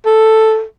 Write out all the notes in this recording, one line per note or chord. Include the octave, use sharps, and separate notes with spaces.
A4